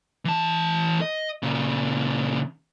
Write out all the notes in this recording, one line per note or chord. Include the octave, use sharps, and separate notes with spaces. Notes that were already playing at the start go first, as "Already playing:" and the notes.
E3 A5
D#5
A#2 C#3